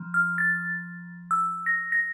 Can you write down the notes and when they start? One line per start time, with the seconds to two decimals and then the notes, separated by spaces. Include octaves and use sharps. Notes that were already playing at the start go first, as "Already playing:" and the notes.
Already playing: F3
0.14 F6
0.38 A6
1.31 E6
1.66 A#6
1.92 A#6